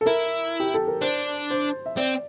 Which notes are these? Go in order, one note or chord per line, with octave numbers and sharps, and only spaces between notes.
A4
E4 A#4
G4
A4
A#4
D4 C5
C5
E5
C4 D5